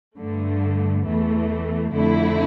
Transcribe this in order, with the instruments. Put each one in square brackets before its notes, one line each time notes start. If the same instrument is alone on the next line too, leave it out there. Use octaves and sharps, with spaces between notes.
[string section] G2 D3 A3
E2 E3 A3
F2 D3 A3 E4